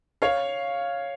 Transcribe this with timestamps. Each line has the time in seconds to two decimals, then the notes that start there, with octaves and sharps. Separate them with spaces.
0.22 C#5 F5